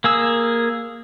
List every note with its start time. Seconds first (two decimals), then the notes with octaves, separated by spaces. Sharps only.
0.04 A#3 G#4 E6